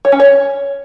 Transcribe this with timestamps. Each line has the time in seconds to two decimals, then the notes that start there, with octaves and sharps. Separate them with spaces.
0.05 C#5
0.12 C#4
0.20 C#5